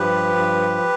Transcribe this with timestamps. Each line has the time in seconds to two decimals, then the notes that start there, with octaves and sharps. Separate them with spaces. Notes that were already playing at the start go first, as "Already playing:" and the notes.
Already playing: G2 F3 G4 B4
0.36 G2